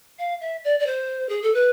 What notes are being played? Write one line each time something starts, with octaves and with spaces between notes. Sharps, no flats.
F5
E5
D5
D5
C5
G#4
A4
B4